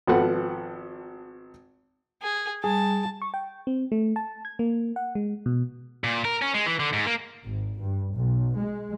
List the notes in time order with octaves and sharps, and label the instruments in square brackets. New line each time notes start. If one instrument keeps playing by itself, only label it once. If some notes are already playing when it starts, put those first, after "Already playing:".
[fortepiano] G#1 F3 B3 A4 F#5
[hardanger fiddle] G#4
[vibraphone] G3 [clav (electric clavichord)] G#4 [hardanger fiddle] A5
[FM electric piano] C#6
G5
C4
A3
A5
G#6
A#3
F#5
G#3
B2
[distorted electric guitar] A#2
A#4
C#4
G#3
E3
D3
G#2
A#3
[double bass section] G#1
G2
B1
G#3